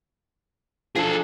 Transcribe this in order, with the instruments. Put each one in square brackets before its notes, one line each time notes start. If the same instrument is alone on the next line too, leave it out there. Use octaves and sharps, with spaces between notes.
[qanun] F3 D4 D#4 [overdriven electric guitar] G#4 A4